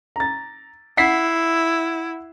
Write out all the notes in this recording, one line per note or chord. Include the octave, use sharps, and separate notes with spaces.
A#5 A6
E4 F#5 B6 C7